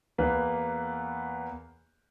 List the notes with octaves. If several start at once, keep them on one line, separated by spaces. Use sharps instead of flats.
E2 A#3 B4